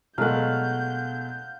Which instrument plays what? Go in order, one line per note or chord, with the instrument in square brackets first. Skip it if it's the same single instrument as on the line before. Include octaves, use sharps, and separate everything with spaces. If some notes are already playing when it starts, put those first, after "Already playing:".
[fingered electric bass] B2 [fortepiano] F#3 G#3 A3 [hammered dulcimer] F5 F#5 [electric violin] G6